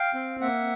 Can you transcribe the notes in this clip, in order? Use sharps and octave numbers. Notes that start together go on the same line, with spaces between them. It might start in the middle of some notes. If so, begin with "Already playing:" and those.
Already playing: F5 G5
C4
A#3 E5 F#5